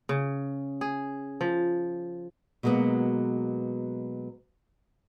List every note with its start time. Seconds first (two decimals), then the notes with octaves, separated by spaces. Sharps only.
0.09 C#3
0.81 G#4
1.41 F3
2.63 B2 F#3 G#3 A#3 B3